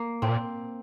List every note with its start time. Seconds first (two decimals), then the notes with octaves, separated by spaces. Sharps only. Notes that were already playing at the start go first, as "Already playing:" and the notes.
Already playing: A#3
0.22 A2 C4
0.29 A#2